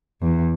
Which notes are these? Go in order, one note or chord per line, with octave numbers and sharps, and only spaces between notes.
E2